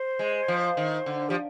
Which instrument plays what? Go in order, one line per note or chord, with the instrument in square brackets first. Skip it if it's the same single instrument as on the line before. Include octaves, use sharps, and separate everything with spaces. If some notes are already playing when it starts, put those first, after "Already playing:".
Already playing: [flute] C5
[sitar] G#3
F3
D#3
D3
[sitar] F3 [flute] G4